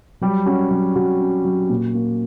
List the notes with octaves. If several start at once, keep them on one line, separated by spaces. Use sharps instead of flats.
F#3 G3 G4
C#4 F#4
F#3
F#3 F#4
C#4
F#3
A#2
A#3